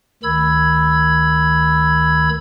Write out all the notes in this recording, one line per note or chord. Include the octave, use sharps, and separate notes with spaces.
D2 D#3 B5 E6 G#6